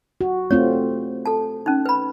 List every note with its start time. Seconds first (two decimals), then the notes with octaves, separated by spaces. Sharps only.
0.21 F#4
0.51 A3 C4 F4 C#5
1.26 A4 A5
1.66 C#4 D#4
1.86 B4 B5